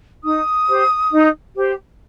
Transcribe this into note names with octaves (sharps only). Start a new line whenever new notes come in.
D#4 D#6
G4 C5
D#4
G4 C5